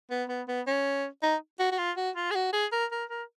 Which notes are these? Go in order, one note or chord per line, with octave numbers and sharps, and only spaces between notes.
B3
B3
B3
C#4
D#4
F#4
F#4
F4
F#4
F4
G#4
F#4
G#4
A#4
A#4
A#4